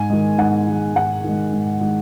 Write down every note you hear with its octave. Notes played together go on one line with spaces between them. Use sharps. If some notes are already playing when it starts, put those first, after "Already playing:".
Already playing: G#2 G#5
D#3 G#3
G#2 F#5
D#3 G#3
G#2 F#5
D#3 G#3
G#2
D#3 G#3